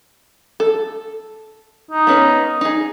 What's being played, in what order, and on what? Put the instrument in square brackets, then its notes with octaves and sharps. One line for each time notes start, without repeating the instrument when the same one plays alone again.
[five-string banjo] A4
[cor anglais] D#4
[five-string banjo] B3 C#4 B4
D#4 G#4